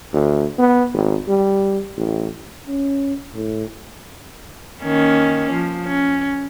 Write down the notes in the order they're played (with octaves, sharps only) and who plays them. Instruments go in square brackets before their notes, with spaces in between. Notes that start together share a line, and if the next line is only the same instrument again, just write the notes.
[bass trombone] D2
B3
G#1
G3
A1
[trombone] C#4
A2
[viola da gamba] D#3 A#3 C#4
F3
C#4